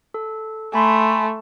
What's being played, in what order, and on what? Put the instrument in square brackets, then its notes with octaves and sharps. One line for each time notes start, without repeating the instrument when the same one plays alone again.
[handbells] A4
[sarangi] A3 [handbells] G#5 B5 C6